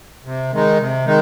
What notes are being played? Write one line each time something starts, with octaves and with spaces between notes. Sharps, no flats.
C3
D#3 G#3 D#4
C3
D#3 G#3 D#4